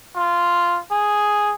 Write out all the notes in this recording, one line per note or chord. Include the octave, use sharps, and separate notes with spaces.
F4
G#4